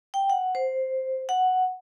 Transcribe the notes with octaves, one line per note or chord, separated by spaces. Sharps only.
G5
F#5
C5
F#5